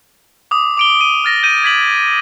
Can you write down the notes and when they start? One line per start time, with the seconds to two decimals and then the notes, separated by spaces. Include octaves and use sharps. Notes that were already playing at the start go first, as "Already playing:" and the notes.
0.51 D6 D#6
0.77 D6 D7 G7
1.01 D#7
1.24 F6 A6 A#6
1.43 G6 D#7 G7
1.64 G#6 B6 F#7